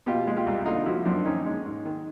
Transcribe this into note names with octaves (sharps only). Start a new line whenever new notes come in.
B2 F4 G4
G#3
F4 G4
C2
D3 D#4 F4
F3 E4 F#4
F#2 C4 D4
D#3 C#4 D#4
G#3
G#2
D#3